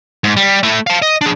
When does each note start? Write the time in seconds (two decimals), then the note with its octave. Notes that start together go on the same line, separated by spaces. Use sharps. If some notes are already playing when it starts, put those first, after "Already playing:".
0.24 G#2
0.37 G3
0.63 A3 E4
0.87 F5 A5
1.02 D#5
1.21 D4 G#4